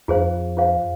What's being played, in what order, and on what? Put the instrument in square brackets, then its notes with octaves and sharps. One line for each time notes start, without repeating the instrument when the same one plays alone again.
[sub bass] F2 [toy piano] F4 G#4 C5 F5
[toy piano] F4 G#4 C5 F5